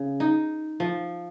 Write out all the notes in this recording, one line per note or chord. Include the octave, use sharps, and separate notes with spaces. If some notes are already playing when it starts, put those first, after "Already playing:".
Already playing: C#3
D#4
F3